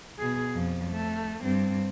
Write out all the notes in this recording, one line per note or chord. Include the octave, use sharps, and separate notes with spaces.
B2 G#4
F2 F3
A3
G2 C4